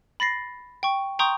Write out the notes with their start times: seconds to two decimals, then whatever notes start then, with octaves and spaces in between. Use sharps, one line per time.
0.20 B5 A6 A#6 C7
0.83 G5 C#6
1.19 G5 A#5 C6 C#6 D#6 G6